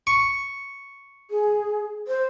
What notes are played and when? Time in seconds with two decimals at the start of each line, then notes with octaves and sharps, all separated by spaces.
0.07 C#6
1.30 G#4
2.08 C5